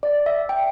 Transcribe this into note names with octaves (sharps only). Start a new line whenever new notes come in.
D5
E5
G5